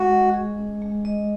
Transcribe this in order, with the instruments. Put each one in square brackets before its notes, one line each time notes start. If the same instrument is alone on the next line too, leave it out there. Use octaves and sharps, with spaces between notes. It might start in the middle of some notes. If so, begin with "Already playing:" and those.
Already playing: [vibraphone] G#3 [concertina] F#4
[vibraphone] D#5
G#4
C#4
G#3
D#5